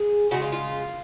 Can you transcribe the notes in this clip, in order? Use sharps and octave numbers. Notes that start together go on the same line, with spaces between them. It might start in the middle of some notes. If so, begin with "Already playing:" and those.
Already playing: G#4
C#3 G#3 F#4
F4
F4